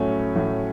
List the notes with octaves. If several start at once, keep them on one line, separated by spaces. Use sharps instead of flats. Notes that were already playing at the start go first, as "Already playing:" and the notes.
Already playing: A2 F#3 A3 C#4
A2 F#3 A3